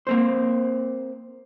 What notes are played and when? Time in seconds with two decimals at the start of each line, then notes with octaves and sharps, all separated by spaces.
0.07 A#3 C4 C5